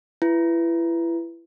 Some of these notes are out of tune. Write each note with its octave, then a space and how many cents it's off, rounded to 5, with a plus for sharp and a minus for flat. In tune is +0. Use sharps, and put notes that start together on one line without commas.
E4 +30 B4 +0